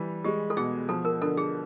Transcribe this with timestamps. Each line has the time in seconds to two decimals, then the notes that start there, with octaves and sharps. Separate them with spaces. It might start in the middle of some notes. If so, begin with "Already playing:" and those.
Already playing: E3 G3
0.25 G#3 G4
0.50 A4
0.57 B2 G#4
0.89 F3 A4
1.05 A#4
1.22 D3 A4
1.37 G#4